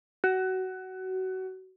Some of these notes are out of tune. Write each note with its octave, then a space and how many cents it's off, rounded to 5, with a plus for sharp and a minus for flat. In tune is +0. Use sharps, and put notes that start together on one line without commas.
F#4 +20